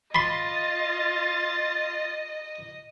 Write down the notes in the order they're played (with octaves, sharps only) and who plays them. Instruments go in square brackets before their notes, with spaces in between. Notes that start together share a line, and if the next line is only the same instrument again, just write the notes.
[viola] F4 [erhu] D#5 [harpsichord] B5 C6 [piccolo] A6